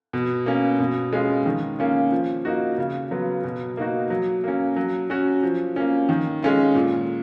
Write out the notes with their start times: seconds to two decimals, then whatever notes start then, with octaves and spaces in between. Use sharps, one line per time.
0.13 B2
0.46 A#3 C#4
0.80 B2
1.13 G#3 C#4 F4
1.46 D#3
1.79 A#3 C#4 F4
2.12 F3
2.45 A#3 D#4 F#4
2.78 C#3
3.11 F#3 B3 F4
3.44 B2
3.77 A#3 D#4 F#4
4.10 F#3
4.44 A#3 C#4
4.76 F#3
5.10 C#4 F#4
5.43 F3
5.76 A#3 C#4
6.09 D#3
6.43 G#3 C#4 F4
6.75 A#2